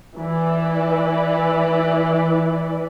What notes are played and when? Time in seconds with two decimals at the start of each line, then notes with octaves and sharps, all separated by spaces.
0.18 E3 B4 D5